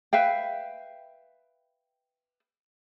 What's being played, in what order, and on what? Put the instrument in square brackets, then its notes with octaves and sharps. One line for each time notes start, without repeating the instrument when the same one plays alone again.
[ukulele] B4 E5 F5 G5